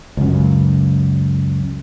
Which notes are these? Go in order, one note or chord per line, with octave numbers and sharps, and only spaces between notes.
C#2 F#2